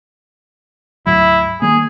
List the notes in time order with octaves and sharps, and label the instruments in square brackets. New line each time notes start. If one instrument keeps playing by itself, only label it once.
[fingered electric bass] D2 G#2 F#3 [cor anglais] E4
[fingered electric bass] D#3 G3 A#3 [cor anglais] G#4